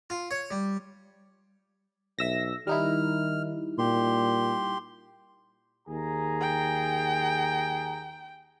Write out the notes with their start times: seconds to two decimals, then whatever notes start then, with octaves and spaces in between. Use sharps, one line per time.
0.10 F4
0.31 C#5
0.51 G3
2.19 B1 E5 E6 A#6
2.67 D#3 G3 D#4 E4 F6
3.78 A#2 G4 C6
5.87 D#2 G#4 A#5
6.41 G5